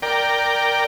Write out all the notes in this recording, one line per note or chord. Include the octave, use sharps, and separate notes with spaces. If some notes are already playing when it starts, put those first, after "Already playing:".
A#4 D5 G5